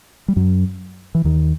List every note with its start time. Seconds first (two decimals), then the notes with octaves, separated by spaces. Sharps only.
0.28 G3
0.36 F#2 F#3
1.15 E3
1.24 D#2 D#3